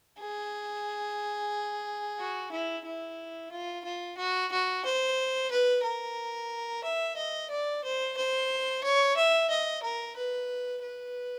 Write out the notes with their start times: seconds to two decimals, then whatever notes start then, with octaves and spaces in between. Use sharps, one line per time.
0.19 G#4
2.19 F#4
2.51 E4
2.85 E4
3.51 F4
3.84 F4
4.17 F#4
4.52 F#4
4.85 C5
5.51 B4
5.83 A#4
6.84 E5
7.16 D#5
7.50 D5
7.84 C5
8.17 C5
8.83 C#5
9.17 E5
9.50 D#5
9.82 A#4
10.17 B4
10.83 B4